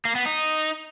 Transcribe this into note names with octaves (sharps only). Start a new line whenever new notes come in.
A#3
B3
D#4